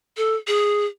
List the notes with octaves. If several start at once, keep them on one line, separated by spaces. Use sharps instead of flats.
A4
G#4